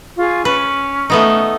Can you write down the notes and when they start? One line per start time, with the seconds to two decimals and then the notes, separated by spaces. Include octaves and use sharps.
0.17 F4 G#4 C#6
0.45 C#4 B4
1.10 A3 B3 D#4